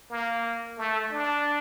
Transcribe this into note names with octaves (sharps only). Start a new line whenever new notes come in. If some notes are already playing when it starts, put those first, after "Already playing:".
A#3
A3
D4